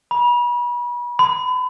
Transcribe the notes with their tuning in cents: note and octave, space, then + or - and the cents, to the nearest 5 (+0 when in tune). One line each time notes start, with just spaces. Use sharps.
B5 -35
B5 +35